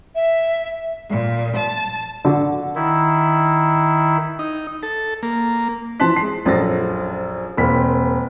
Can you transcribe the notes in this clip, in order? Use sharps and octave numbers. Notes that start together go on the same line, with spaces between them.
E5
A#2
A5
D3 F#4
D#3 E4
D#4
A4
A#3
E3 F3 A5 C6 F#6 B6
G#3 C7
A#1 F#2 F3 A4 A6 A#6
E1 A#3 C4 B6